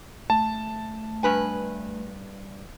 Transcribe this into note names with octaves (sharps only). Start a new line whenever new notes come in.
A3 A5
G2 B4 G#5